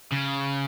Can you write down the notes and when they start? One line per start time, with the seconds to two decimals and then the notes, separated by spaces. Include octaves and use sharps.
0.12 C#3